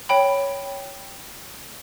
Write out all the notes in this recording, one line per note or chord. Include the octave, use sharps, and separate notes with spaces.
C#5 G5 B5